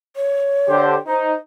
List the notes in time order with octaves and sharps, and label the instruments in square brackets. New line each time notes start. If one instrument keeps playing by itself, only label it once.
[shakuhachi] C#5
[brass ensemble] D3 G4 C5
[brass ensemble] D#4 [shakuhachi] C5